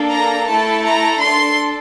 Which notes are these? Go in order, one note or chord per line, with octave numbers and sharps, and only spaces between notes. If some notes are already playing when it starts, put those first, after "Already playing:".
Already playing: A#3 D4 A4
A#5
A3 E4 A4 A5
A#5
D4 A4 C6